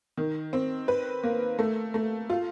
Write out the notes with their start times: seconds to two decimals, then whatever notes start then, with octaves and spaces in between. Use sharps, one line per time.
0.17 D#3
0.53 C4
0.88 B4
1.23 A#3
1.59 A3
1.94 A3
2.30 F4